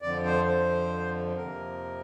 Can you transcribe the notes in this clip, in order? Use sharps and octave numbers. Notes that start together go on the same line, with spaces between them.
F2 D3 F3 D5
C5
C5
F2 C3 F3 A#3 A#4